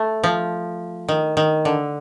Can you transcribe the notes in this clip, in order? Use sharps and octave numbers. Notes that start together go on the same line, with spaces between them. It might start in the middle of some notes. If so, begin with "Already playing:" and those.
Already playing: A3
F3
D#3
D#3
D3